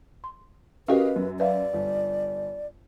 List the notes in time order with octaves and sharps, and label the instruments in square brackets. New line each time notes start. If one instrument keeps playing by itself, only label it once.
[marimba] C6
[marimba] C#4 F#4 A#4 [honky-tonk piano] G4 D#5 F5 [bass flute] B4
[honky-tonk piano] F#2
[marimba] B4 E5 F5 [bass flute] D5
[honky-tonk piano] G1